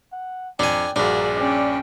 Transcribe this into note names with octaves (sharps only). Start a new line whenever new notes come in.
F#5
F2 D4 G5 G#5
A#1 G2 A#3 D4 F#4 G#4
C#4 D5 G5